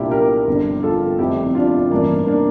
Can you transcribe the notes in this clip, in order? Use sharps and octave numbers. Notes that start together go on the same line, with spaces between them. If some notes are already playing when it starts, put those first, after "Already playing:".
Already playing: C2 A#2 D4 E4 F4 G4
G4 A#4
G1 F2 D3
F4 A4
F1 F2 C3 E4 G4
D4 F4
A1 G2 E3 A#3 D4
A#3 D4